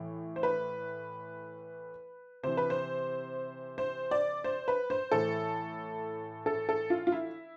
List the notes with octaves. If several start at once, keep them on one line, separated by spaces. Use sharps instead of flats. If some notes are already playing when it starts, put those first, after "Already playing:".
Already playing: A2 E3
C5
B4
C3 E3 C5
B4
C5
C5
D5
C5
B4
C5
A2 E3 A4
A4
A4
F4
F4
E4